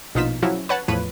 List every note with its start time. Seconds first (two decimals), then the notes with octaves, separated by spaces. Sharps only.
0.15 A#1 B2 D#4 F4 B6 E7
0.42 C#3 F3 F#3 C#4 E4 F#4
0.69 B4 C#5 F#5 A5
0.88 E2 A2 F3 B4 C#5 D#7